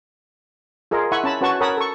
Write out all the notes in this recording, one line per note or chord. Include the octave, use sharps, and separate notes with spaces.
F4 G#4 A#4 D#5
E4 E5 F#5 G#5 B5 C#6
C#4 A5 B5
C#4 F#4 B4 F#5 A5 C#6
A#4 C#5 F#5 A5 B5 D#6
A4 C#6